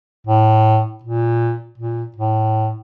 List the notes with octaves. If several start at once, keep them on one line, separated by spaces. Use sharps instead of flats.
A2
A#2
A#2
A2